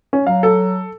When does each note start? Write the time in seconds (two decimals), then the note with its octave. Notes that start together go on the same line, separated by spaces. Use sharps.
0.13 C#4
0.27 F#3 F5
0.43 A4